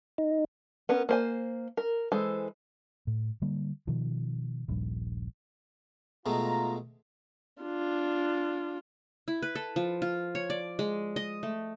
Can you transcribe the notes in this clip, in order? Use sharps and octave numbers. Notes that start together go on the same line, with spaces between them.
D#4
B3 C#4 A#4
A#3 C5 G#5
A#4
E3 G#3 A4 C5
A2
D3 G3 A#3
B2 D#3 F3
D#1 A#1 G2
B2 G#3 A3 F4 A#5
D4 F4
E4
B4
A4
F3
F4
C#5
D5
G#3
D#5
A3